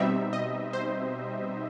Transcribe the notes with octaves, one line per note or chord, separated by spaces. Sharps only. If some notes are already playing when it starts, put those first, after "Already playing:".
Already playing: B2 G3 C4 D#4 E5
D#5
C5